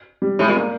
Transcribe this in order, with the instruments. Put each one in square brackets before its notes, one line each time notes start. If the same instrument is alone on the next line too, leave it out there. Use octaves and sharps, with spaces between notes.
[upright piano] G3
[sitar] A2 [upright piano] G#3
[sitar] A#2
[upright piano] A#3